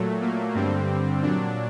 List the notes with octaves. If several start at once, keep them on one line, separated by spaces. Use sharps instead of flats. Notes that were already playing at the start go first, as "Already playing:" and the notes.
Already playing: A#2 F#3 A3
A#3
G2 D3 G3 C4
A#2 F#3 D4